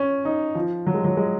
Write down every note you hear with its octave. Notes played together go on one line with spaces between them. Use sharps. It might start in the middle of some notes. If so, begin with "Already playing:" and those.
Already playing: C#4
D#4
F3
F#3
G#3
F#3
G#3